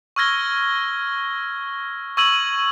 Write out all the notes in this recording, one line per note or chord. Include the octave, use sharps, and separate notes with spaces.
C#6 E6 F6 G#6 A#6 G7
C#6 E6 G#6 D#7 F#7